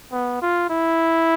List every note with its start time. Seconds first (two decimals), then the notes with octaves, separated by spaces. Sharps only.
0.12 B3
0.42 F4
0.70 E4